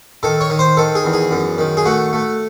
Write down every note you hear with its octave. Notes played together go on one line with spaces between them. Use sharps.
D#3 A4
C#5
D#3
C5
D#3 A4
G#4
E2
G#4
F#2
D#3
G#4
A3 F#4
A3